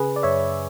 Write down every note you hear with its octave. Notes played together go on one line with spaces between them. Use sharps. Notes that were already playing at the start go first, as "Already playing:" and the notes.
Already playing: C#3 G#4 B4
D5
F#2 C#5 E5